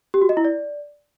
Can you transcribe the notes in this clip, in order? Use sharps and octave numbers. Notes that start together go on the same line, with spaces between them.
G4
F#4
D#5
E4
D5